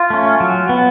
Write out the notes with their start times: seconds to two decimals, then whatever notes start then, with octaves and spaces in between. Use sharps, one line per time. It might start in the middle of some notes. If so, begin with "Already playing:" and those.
Already playing: F4
0.10 A3 C#4
0.40 F#3
0.69 B3